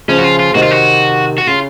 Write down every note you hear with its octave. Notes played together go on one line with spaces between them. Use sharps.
C#3 F3 C#4
F#4
F4
F4
C3 D#3 F#4
F4
F#4
F#4
C#3 F4